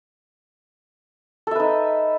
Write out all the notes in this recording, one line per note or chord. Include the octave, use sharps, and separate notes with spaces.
D#4 A4 B4 E5